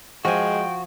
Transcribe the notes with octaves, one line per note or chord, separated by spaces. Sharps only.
F3 G#3 F#4 G5 G#5